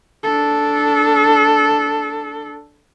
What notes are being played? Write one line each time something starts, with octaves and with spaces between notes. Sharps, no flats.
D4 A4